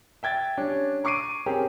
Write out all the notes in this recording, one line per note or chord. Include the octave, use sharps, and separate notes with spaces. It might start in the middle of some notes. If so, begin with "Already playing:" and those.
E5 G5 G#6 A6
G3 C#4 D4
A#5 C#6 D6 C7 D7 D#7
C4 C#4 G4 G#4 A#4